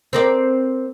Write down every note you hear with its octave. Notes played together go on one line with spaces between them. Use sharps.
C4 A#4 D5